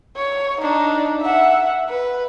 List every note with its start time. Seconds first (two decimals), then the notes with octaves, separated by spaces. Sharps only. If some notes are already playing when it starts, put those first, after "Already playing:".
0.16 C#5
0.61 D4 D#4
1.21 E5 F#5
1.89 B4